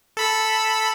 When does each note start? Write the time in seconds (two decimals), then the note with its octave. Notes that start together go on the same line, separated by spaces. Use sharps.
0.17 A4 B5 E6